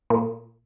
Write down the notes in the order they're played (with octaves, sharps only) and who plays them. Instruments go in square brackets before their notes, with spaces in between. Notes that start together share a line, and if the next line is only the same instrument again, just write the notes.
[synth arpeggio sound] A#2